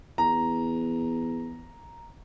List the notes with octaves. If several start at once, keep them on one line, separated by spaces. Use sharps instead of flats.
E2 A#5